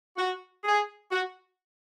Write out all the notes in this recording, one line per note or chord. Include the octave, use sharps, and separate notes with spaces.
F#4
G#4
F#4